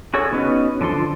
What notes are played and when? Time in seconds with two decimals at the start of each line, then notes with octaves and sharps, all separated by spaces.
0.14 F#4 G#4 A4 C#5 C#6
0.33 B3 C#4 D#4 F#4 B4
0.81 D3 F3 A4 C6